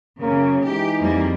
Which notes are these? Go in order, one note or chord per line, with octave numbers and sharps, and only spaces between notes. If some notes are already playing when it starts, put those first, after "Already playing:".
F#2 C#3 A#3
E3 G#3 D#4 G4
F2 G3 A#3